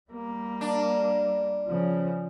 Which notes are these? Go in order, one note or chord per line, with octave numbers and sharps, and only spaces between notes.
G3 A#3
D4
C#3 F3